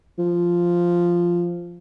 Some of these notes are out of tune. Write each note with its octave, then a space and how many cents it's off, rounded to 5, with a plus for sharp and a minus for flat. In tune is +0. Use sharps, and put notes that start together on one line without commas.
F3 -5